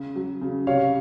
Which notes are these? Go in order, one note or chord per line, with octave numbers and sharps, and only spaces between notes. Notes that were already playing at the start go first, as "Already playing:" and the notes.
Already playing: C#3
F#3
C#3
C3 C#5 F5